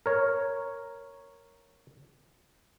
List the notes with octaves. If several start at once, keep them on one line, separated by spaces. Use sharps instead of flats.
A#4 C#5